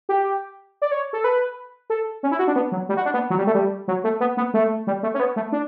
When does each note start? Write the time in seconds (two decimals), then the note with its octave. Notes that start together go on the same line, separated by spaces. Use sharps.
0.09 G4
0.82 D5
0.91 C#5
1.13 A4
1.24 B4
1.90 A4
2.23 C#4
2.32 E4
2.39 F#4
2.48 D4
2.56 B3
2.72 F#3
2.89 G3
2.97 F#4
3.06 D4
3.14 B3
3.30 F#3
3.38 G3
3.47 A3
3.55 G3
3.88 F#3
4.04 A3
4.20 B3
4.37 B3
4.54 A3
4.87 G3
5.03 A3
5.14 C#4
5.20 B3
5.36 A3
5.52 D4